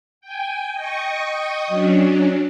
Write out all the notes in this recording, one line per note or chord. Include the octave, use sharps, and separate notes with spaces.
G5 G#5
D#5 G5 C#6 D#6
F#3 C#4 D4